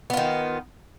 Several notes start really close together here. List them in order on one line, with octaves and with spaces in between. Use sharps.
B3 F4 D#3